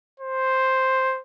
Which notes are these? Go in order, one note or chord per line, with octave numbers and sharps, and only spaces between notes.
C5